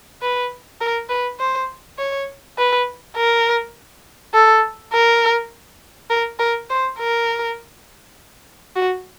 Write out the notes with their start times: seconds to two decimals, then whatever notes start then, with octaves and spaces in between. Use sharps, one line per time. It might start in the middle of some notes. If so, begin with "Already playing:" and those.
0.22 B4
0.81 A#4
1.09 B4
1.40 C5
1.98 C#5
2.58 B4
3.16 A#4
4.34 A4
4.93 A#4
6.10 A#4
6.40 A#4
6.70 C5
6.99 A#4
8.76 F#4